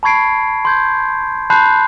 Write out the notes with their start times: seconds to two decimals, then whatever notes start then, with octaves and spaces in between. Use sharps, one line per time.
0.03 A5 B5 C#6 G#6 C7 D7
0.65 C6 G6 G#6
1.50 A5 B5 C6 F#6 G6 C7